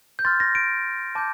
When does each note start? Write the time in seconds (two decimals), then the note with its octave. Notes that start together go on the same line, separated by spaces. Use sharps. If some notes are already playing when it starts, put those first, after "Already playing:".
0.19 G6
0.25 C6 F6 A6
0.40 A#6
0.55 D7
1.15 A5 D6 G6